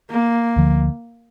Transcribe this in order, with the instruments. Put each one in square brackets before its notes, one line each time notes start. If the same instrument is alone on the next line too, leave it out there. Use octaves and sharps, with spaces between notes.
[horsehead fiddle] A#3
[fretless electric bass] D2 D3 F3